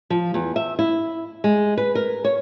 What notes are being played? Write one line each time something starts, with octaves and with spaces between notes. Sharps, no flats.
F3
E2
E5
E4
G#3
B4
A#4
C#5